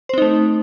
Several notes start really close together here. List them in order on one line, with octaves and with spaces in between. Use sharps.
C5 C4 D#4 A3